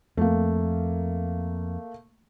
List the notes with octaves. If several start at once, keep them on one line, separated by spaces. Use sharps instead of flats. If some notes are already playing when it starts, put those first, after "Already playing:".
F2 A3 A#3